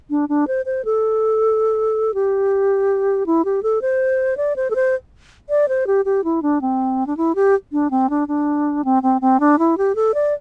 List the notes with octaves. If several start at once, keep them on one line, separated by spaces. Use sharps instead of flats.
D4
D4
C5
C5
A4
G4
E4
G4
A4
C5
D5
C5
A4
C5
D5
C5
G4
G4
E4
D4
C4
D4
E4
G4
D4
C4
D4
D4
C4
C4
C4
D4
E4
G4
A4
D5